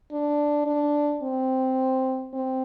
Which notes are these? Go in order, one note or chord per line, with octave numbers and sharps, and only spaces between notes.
D4
D4
C4
C4